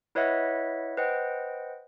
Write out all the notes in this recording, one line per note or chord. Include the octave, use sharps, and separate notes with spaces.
E4 B4 C#5 D#5 E5 F#5
B4 C5 D#5 F#5 G5